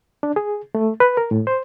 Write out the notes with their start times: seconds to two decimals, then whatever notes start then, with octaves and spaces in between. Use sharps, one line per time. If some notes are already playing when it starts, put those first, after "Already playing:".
0.23 D4
0.36 G#4
0.75 A3
1.00 B4
1.17 A#4
1.31 A2
1.47 C5